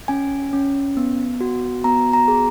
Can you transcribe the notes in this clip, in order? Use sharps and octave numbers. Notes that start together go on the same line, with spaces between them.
C#4 G#5
C#4
B3
F#4
B3 A#5
A#5
G#4